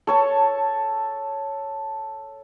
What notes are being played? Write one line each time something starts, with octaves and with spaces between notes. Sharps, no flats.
A4 C#5 A5